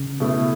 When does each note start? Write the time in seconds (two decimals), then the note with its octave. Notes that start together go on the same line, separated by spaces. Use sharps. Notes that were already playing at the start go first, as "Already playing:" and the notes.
Already playing: C#3
0.20 B2 A3 E4